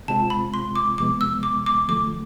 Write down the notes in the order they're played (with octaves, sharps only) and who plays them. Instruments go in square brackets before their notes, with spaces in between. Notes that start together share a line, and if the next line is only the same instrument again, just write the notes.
[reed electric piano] C3 G#3 C4 F4 [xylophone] A5
[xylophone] B5
C6
D6
[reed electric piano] E2 C3 F3 G#3 B3 [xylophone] D6
[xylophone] E6
D6
D6
[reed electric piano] D2 D3 F3 A3 [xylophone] D6